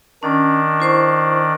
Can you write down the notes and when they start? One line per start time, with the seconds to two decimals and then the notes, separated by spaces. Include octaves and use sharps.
0.23 D#3 C#4 D4
0.80 E4 C5 C#6